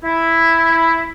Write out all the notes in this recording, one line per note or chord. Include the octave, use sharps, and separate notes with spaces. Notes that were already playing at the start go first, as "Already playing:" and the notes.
E4